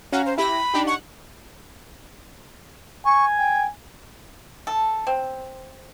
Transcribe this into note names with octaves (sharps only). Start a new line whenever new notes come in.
C#4 F#4 F5 A#5
C5
E4 G4 B5 A#6
D4 D#4 G4
F#5 C#6
G#5 C#6
G5
A4
C4